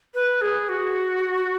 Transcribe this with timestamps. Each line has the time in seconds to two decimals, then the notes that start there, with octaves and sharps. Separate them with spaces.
0.14 B4
0.41 G#4
0.69 F#4